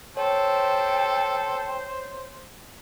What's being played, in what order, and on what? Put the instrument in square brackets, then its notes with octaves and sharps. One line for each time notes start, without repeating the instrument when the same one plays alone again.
[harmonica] A4 [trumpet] C5 [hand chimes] C#5 [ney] G5